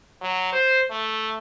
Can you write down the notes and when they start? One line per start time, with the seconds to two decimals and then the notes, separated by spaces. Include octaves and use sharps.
0.21 F#3
0.53 C5
0.91 A3